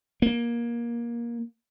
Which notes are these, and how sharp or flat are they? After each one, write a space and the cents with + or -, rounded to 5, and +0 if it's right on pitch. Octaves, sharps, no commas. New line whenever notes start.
A#3 +20